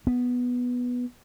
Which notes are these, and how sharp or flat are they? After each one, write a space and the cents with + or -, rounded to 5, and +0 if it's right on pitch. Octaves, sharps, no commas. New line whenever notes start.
B3 -5